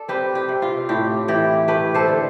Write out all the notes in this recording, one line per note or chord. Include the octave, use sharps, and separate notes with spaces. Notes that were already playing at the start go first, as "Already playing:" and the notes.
Already playing: A4 D5
C4 G4 B4
G4
C3
F4
A2 G4
E3 G4
A3 G4 B4
A4 C5
D3